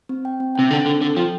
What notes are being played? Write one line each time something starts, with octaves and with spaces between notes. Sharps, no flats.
C4
G5
C4
C3 G5
D3 A4
D3 C4
D3 A4
F3 G5